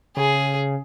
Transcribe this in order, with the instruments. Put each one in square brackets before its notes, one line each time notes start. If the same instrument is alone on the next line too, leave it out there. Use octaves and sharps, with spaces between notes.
[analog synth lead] C#3 [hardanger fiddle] G#4